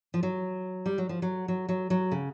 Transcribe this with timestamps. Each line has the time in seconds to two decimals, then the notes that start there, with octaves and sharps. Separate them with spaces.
0.14 F3
0.23 F#3
0.86 G3
0.98 F#3
1.09 F3
1.22 F#3
1.48 F#3
1.69 F#3
1.90 F#3
2.12 C#3